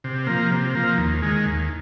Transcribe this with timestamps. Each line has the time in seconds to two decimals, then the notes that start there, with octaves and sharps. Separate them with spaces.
0.04 C3
0.27 F3 A#3
0.51 C3
0.75 F3 A#3
0.98 D#2
1.22 D#3 G#3
1.45 D#2